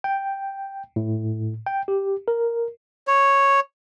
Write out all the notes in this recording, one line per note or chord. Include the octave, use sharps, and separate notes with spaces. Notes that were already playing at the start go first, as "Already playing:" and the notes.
G5
A2
G5
G4
A#4
C#5